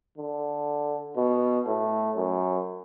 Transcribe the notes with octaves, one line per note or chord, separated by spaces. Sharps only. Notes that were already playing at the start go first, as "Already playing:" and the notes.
D3
B2
A2
F#2